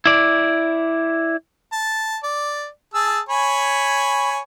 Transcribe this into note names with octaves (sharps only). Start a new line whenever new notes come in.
E4 D5
A5
D5
G#4 A5 E6
C#5 G#5 B5